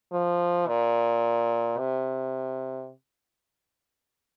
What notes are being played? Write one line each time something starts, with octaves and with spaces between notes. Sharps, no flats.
F3
A#2
C3